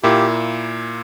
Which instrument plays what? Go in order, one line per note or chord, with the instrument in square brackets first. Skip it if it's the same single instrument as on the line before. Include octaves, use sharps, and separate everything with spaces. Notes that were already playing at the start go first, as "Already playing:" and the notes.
[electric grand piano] A#2 A#3 E4 [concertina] G4